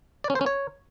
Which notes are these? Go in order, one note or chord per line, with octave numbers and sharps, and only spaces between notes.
D5
C#4
C5
C#4
C#5